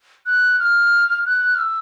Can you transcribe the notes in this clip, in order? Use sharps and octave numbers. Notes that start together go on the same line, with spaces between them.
F#6
F6
F#6
F6
E6